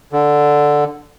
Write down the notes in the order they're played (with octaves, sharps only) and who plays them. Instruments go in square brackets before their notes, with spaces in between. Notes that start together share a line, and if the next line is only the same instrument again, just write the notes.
[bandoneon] D3